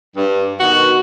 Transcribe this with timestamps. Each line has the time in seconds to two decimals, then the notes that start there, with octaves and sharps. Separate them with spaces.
0.16 G2
0.60 B2 D#3 F#4